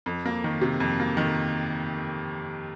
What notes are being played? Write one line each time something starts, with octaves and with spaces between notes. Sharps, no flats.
F2
A#3
D#3
C3
F2
A#3
D#3